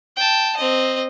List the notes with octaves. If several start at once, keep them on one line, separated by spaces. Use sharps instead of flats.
G5 A5
C4 D#5